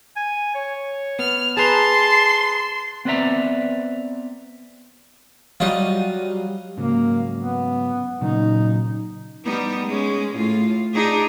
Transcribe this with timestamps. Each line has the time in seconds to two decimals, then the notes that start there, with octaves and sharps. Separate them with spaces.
0.16 G#5
0.55 C#5
1.19 B3 F6
1.57 G#4 B4 A5 A#5 C6
3.05 B3 C4 B4 D5 E5 A#5
5.60 F#3 G3 F4 F#4 D#5
6.77 G#2 C#3 F#3 A#3
7.39 B3
8.21 A#2 C#3 F#3 D#4
9.45 G3 B3 D#4
9.86 G#3 C#4
10.36 A2 F4
10.94 D4 D#4 G#4